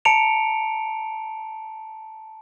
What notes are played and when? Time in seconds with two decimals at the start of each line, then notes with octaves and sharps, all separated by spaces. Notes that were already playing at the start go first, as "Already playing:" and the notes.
0.05 A5 A#5 C#7 D7 F7